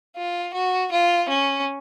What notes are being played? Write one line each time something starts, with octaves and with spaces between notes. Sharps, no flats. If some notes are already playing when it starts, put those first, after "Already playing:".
F4
F#4
F4
C#4